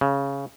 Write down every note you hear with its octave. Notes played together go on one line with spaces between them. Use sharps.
C#3